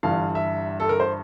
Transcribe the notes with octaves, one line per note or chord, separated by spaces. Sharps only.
G1 G2 E3 G3 F5
E5
A4
A#4
C5